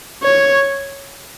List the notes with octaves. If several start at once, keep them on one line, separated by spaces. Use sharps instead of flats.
C#5